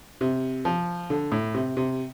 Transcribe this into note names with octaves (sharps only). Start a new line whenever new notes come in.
C3
F3
D3
A2
C3
C3